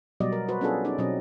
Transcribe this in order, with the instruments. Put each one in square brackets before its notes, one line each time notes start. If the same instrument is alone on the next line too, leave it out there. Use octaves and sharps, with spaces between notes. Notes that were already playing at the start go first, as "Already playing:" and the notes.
[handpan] B2 F#3 G3 B3 D5 D#5
A#4
F#4 B4 C5
B3 C#4 D4 F4 G#4 A4
C#4 D#4 D5
B2 F#3 C4 C#4 D#5